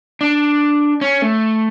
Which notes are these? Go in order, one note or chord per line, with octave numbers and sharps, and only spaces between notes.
D4
C#4
A3